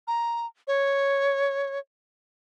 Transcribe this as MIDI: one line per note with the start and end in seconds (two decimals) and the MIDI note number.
0.07 0.46 82
0.67 1.79 73